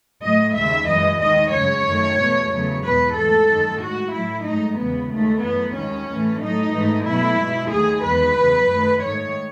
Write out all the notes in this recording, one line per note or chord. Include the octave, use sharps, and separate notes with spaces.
A2 F#3 A3 D#5
D#2 C#3 G#3 E5
F#2 E3 G#3 D#5
D#2 D#3 G#3 D#5
F#2 C#3 G#3 C#5
F#2 D#3 A3
E2 B2 A3
E2 C#3 F#3 A3
E2 B2 G#3 B4
G#2 E3 A3 A4
F#2 D#3 A3
A2 G#3 F#4
A2 F#3 A3 E4
G#2 F#3 A3 D#4
E2 C#3 E3 G#3 B3
D#2 D#3 G#3 A3
F#2 E3 A3 B3
D#2 D#3 G#3 C#4
A2 E3 A3
A2 F#3 A3 D#4
G#2 E3 A3
B2 F#3 A3 E4
B2 G#3
D#2 D#3 F#3 A3 G#4
E2 D#3 G#3 B4
E2 C#3 F#3
F#2 D#3 A3
G#2 D#3 A3 C#5